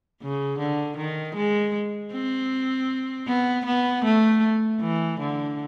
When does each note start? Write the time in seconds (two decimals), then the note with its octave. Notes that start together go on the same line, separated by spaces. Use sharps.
0.22 C#3
0.59 D3
0.98 D#3
1.36 G#3
2.12 C4
3.28 B3
3.66 B3
4.05 A3
4.81 E3
5.20 D3